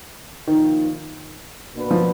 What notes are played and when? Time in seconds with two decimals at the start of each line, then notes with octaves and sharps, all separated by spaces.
0.47 A#2 D#3 F3 A#3 F4
1.75 B2 A#3 D4 F#4 B4
1.91 F3